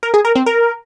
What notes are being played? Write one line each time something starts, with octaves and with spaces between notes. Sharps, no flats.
A#4
G#4
A#4
C4
A#4